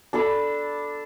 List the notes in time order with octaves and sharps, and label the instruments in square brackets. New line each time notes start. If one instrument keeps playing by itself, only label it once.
[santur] D4 A4 B5